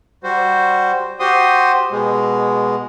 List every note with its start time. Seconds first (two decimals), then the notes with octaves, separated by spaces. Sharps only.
0.24 G3 F#4 C5
1.20 F#4 G4 C5 C6 D#6
1.91 B2 G#3